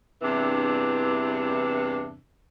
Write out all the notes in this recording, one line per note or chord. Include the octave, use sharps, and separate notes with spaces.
E2 G2 C3 E3 D4